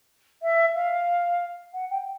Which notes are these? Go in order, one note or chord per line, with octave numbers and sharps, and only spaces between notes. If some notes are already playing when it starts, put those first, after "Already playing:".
E5
F5
F#5
G5